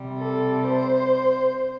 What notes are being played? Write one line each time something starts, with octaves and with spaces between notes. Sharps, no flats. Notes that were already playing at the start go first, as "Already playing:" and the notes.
Already playing: C3 G3
A4
C5